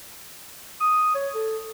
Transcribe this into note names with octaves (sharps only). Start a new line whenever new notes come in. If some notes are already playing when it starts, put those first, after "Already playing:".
D#6
C#5
A4